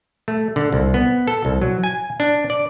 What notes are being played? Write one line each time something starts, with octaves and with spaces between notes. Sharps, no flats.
A3
D3
C2
B3
A4
C2
F#3
G#5
D4
D5